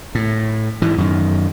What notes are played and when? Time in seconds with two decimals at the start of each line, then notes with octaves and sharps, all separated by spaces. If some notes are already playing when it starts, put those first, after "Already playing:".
0.15 A2
0.82 G#2 E3
0.98 F#2 D#3